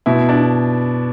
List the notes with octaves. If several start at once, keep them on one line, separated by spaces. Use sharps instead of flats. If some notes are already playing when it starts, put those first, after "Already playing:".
B2 E4
D4